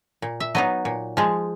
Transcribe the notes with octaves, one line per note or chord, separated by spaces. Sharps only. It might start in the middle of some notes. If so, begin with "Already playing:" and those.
A#2
E5
F#3 B3 D#4 D#5
A#2
F3 G#3